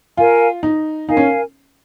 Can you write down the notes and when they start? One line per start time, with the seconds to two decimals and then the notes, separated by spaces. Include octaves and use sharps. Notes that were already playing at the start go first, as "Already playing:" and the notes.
0.17 F4 A#4 F5 G#5
0.63 D#4
1.08 D#4 A#4 F5 G#5
1.17 C#4